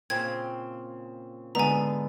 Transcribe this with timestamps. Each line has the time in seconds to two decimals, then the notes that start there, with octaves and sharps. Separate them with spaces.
0.10 A#2 C#3 C4 G#6
1.55 G#2 D3 B3 G#5 A#5